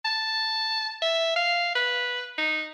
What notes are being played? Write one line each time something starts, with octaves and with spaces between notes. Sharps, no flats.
A5
E5
F5
B4
D#4